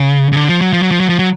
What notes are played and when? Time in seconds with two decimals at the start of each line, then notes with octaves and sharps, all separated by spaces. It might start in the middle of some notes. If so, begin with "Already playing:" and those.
Already playing: C#3
0.32 C#3
0.37 D3
0.49 F3
0.61 F#3
0.73 F3
0.82 F#3
0.91 F3
1.00 F#3
1.09 F3
1.19 F#3